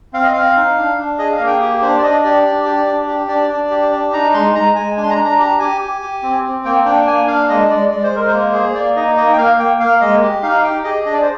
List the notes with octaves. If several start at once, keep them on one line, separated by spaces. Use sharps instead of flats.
C4 F5
D#5
C4 F5
D#4
D4
D4
G#4 D#5
F5
A#3
G5
G4
D4 C5
D5
D4 D#5
G4 D5
D4
G4
D4
G4
D4 D5
D4
G4
D4
D#4 A#5
G#3 C6
G#3 A#5
G#3 G#5
D4 G#5
C6
A#5
D4
A#5
G4 A#5
G4 G#5
G4
G4
C4
C4
A#3 G5
D4 G5
A#3 G#5
D4 F5
G#3 D#5
G#3 D5
G#3 D5
C5
G#3 A#4
C5
A#3
G#4
A#3 D5
D#4 D#5
A#3 D#5
G5
A#3 F5
A#3 G5
A#3 F5
G#3 D#5
G4
D#4 F5
G4 G5
G#4 D#5
D4 D#5
D5
C5